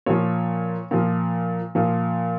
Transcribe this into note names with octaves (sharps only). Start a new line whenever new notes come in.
A#2 F3 C#5
A#2 F3
A#2 F3